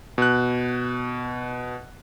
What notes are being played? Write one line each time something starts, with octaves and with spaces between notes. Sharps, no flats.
B2 F#6